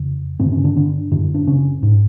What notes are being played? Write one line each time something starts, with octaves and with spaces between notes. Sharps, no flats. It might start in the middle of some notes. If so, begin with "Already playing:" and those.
Already playing: F2 C#3
G2 C3 D3 C4
C#3 C#4
D3 D4
D3 D4
F#2 D3
D4
C#3 C#4
G#2